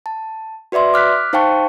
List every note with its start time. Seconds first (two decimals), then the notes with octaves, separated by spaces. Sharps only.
0.06 A5
0.72 F#4 B4 D5 E5 C6
0.94 D6 F6 F#6 B6
1.33 D#4 C5 F5 G5 A5 C#6